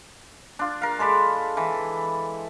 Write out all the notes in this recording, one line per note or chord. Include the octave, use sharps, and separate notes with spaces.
D4 F4
A#4 F5
G#3 A4 D5 B5
E3